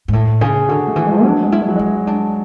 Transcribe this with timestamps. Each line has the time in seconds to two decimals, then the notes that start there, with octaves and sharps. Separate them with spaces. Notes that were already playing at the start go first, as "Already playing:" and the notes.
0.08 G#2
0.13 A2
0.41 C#3 G#4
0.69 D3 F#4
0.87 A3
0.96 E3
1.06 G#3
1.24 F#3 D4
1.43 G#3
1.52 E4
1.61 G#3
1.68 F#3
1.76 G#3 C#4
2.07 D4